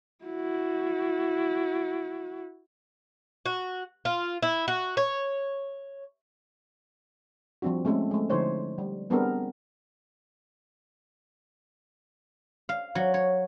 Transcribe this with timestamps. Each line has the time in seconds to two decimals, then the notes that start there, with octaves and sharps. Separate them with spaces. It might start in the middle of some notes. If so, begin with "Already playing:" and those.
0.25 E4 F#4
3.46 F#4
4.05 F4
4.42 E4
4.68 F#4
4.97 C#5
7.62 F3 G3 C4 D4 F#4
7.85 G#3 A3 C4 C#4 A4
8.11 G#3 A3
8.30 D3 F3 D#4 E4 C5 C#5
8.78 G3
9.10 G3 B3 C4 D4 G#4 A#4
12.69 F5
12.95 F#3
13.14 C#5